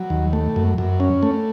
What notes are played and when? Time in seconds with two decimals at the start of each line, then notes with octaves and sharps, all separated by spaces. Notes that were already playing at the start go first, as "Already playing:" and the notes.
Already playing: F#3
0.10 D#2
0.33 A3
0.56 F#2
0.78 F#2
1.00 C#4
1.23 A3